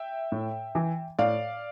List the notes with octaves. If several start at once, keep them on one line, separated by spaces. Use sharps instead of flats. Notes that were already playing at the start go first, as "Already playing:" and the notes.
Already playing: E5 G5
A2
E3
A2 D5 F5